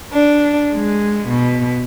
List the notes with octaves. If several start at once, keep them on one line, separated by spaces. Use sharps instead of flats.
D4
G#3
B2